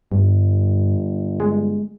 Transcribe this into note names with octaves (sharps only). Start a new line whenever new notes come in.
G1 G2
G#3